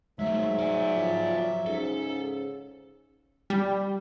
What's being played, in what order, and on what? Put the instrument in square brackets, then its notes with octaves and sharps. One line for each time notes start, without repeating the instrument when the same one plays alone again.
[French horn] G#2 [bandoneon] F#3 E5 [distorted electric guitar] G#3 A3
[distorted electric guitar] D5 G#5
[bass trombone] F3
[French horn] G#2 [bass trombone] C#3 [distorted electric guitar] A4
[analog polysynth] G3